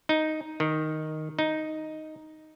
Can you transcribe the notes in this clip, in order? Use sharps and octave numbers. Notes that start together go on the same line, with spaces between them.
D#4
D#3
D#4